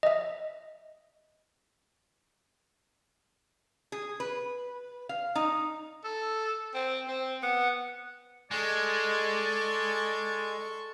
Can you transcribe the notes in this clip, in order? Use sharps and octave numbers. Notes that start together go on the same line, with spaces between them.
D#5 E5
G#4
B4
F5
D#4
A4
C4
C4
B3 F#5
G#3 A4 D5 C#6